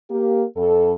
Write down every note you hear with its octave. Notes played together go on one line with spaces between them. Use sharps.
A#3 G4
F2 A4